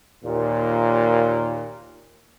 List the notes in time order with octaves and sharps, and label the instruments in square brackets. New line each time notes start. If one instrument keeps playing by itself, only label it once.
[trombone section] D#2 A#2